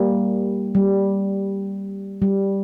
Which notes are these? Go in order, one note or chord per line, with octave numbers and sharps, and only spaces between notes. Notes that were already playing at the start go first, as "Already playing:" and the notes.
Already playing: G3 A#3
G3
G3